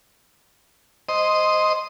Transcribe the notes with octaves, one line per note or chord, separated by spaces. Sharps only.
C5 D#5